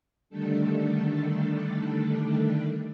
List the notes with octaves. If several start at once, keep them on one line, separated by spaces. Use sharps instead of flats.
D3 D#3 G3 A3 D4 A4